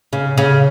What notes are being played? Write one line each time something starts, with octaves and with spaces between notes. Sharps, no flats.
C#3
C#3